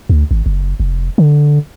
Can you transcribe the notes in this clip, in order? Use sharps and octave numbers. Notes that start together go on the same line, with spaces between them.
D2
G#1
F#1
F1
D3